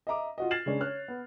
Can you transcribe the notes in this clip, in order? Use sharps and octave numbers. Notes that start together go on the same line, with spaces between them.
D#5 E5 A#5 D6
F4 F#4 D#5
F6 G#6 A6 C7 E7 F#7
C#3 G#3 C#4 D4
C#5 F6 F#6
B3